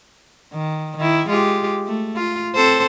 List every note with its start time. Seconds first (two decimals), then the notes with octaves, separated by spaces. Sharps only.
0.53 D#3
0.97 D#3 E4
1.28 G#3 F4 G4
1.87 A3
2.17 F4
2.55 C4 A4 C5